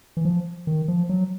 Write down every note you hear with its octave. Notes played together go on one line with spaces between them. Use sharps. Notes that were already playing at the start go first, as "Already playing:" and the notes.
E3
F3
D#3
F3
F#3